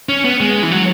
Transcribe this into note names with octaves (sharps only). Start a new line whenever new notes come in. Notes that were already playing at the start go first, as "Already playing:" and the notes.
C#4
B3
G#3
E3
F#3